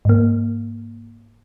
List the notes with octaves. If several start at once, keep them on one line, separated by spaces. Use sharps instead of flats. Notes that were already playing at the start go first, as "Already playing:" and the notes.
G#2 A#3